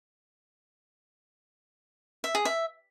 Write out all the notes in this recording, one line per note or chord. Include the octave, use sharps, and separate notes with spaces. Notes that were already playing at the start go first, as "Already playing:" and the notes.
E5
G#4
E5